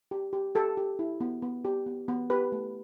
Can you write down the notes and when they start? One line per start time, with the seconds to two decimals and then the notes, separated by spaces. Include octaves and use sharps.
0.11 G4
0.33 G4
0.55 G4 A4
0.77 G4
0.99 E4
1.21 B3
1.42 B3
1.65 G4
1.86 B3
2.08 B3
2.30 G4 B4
2.52 A3